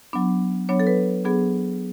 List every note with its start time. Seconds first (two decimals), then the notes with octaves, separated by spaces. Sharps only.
0.13 F#3 B3 D4
0.69 F#3 B3 D4 C#5
0.80 A4
0.87 B4
1.25 F#3 B3 D4 G#4